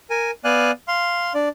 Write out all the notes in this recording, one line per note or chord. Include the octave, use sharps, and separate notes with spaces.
A#4 G#5
B3 D5 F5 G#5 F#6
F5 C6
D4 D5